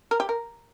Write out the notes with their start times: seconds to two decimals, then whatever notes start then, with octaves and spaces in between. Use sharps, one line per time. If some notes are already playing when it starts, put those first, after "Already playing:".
0.11 A#4
0.20 G4
0.29 A#4